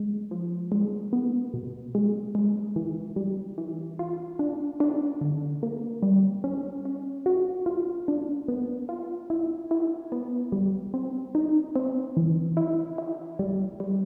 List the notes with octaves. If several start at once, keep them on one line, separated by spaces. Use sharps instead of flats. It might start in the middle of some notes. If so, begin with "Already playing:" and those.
Already playing: G#3
F3
G#3
B3
B2
G#3
G#3
E3
G3
E3
F4
D4
D4
D3
A#3
G3
C#4
C#4
F#4
F4
D4
B3
F4
E4
E4
B3
G3
C4
D#4
C4
E3
E4
E4
G3
G3